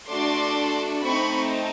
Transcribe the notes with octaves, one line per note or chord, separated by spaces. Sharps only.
A3 D4 F#4 A4 C6 D6
A3 C4 D#4 B5 C#6